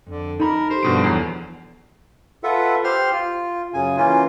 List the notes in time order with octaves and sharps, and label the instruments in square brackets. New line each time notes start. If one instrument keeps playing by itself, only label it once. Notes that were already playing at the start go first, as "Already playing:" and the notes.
[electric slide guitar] F2 [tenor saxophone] D3
[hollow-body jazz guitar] D#4 B5 [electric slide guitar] A4 [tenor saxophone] A#4
[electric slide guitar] G4 [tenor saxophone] C5
[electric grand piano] G2 B2 D7 [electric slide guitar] F3 A4
[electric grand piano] E2 C7 [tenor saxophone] F#3
[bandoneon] F4 A4 B4 E5 F#5
G4 C5 C6 F6
F4
F#2 C#3 G#5
E3 A#3 C#4 F4